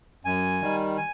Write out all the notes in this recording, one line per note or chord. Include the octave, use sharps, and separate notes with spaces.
F#2 G#5
D#3 G3
G#5